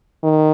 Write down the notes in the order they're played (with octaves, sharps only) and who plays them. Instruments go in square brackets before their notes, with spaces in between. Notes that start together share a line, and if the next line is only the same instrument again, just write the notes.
[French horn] D#3